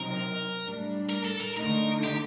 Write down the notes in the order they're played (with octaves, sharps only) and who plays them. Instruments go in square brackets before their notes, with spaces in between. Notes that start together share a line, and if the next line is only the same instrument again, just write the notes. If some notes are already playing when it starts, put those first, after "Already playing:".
Already playing: [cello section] C3 F#3 C4 D#4 [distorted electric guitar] A#4
[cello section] A2 G3 D4
[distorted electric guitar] A#4
A4
A#4
[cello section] D3 A3 D#4 [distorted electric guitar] A#4
[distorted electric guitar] G4